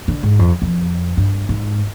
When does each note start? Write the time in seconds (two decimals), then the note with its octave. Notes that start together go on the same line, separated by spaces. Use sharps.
0.08 D3
0.23 G#2
0.39 F2
0.62 F2
1.17 G2
1.49 G#2